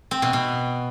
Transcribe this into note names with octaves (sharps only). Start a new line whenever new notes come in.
C4
B2
B2